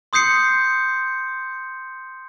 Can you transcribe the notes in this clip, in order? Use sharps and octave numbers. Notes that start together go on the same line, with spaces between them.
C6 D#6 G6 C7 C#7